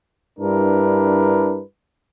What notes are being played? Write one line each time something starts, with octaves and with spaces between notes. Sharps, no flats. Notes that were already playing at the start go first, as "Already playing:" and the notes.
G2 G3 D4 E4 A#4 B4